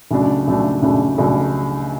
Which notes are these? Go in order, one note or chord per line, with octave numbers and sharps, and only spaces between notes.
C#2 C#3 F#3 A3 D4
C#2 C#3 F#3 A3 D4
C#2 C#3 F#3 A3 D4
C#2 C#3 F#3 A3 D4